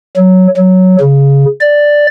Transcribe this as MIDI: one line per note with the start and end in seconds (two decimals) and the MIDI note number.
0.17 0.47 54
0.57 0.96 54
1.00 1.45 49
1.61 2.07 74